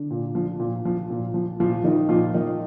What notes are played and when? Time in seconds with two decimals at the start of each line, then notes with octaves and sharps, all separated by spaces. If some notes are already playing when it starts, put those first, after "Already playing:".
Already playing: D3 D4
0.11 A#2
0.35 F3
0.60 A#2
0.85 F3
1.10 A#2
1.34 F3
1.60 A#2 F3 F4
1.84 D#3 F3 D#4
2.09 A#2 F3 F4
2.34 D#3 F3 D#4